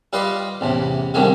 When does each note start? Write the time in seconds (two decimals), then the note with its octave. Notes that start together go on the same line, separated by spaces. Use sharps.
0.13 G3 F4 B4 D5 D#5 F5
0.61 A1 E2 C3
1.14 C2 F2 D3 D#3 G3 G#3